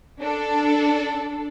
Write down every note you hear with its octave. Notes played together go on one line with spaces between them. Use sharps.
D4 A4